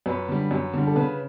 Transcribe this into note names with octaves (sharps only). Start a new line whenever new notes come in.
F#2 B4
D3 G3
F#2
D3 G3
A4
C#3 B4